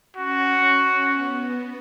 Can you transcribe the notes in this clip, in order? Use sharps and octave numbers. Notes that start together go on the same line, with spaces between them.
C#4 F#4
B3